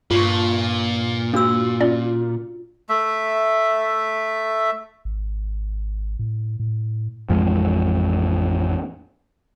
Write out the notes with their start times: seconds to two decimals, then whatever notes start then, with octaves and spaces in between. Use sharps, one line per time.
0.11 G2 A#2 F4 C#6
1.34 A#3 D4 F#4 E6
1.81 C#4 F4 D5
2.89 A3 E5
5.05 G#1
6.19 A2
6.60 A2
7.29 A1 F2 F3 G#3